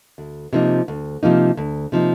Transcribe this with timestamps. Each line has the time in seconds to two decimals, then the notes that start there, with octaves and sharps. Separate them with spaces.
0.18 D2
0.53 C3 F3 A#3 D#4
0.88 D2
1.23 C3 F3 A#3 D#4
1.57 D2
1.92 C3 F3 A#3 D#4